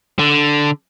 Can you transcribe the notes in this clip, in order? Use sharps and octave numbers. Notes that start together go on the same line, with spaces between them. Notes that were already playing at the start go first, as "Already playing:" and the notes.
D3